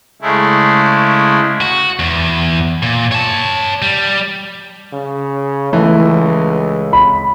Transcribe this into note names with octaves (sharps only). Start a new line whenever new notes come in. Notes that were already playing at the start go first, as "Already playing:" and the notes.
C#3 G#3 A3 E4
F#4
E2
A#2
C#5 A5
G3
C#3
C#2 E3 A3
B5